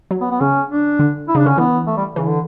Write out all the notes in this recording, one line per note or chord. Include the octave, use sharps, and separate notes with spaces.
F#3
B3
B3
C#3 C#4
D4
D3
E4
C#3 D4
D3 C#4
E3 B3
A3
G3
C#3 E3
D3